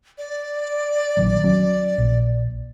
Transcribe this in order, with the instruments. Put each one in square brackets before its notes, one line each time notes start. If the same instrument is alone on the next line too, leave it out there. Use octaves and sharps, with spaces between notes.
[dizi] D5
[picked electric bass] A#1 D#3 F#3
F#3 C#4
A#1